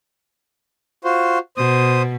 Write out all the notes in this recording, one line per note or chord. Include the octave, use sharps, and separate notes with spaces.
F4 F#4 C5
B2 C5 D#6